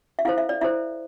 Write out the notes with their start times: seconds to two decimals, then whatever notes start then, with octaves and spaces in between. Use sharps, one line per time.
0.19 E5
0.25 E4 A4 C5 F5
0.38 E5
0.49 D5
0.61 E4 A4 C5 E5